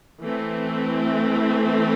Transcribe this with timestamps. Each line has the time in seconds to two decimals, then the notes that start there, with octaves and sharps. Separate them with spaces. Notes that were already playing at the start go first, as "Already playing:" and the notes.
0.23 E3 A3 C4